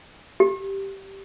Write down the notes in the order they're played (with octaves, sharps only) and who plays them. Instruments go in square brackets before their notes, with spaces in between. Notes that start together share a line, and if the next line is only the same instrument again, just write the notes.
[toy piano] G4